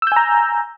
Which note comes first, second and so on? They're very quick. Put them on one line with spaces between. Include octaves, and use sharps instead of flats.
E6 G6 G#5 A#5